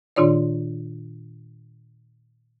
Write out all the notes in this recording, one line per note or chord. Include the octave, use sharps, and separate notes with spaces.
A#2 D#3 D4 F4 C#5 D5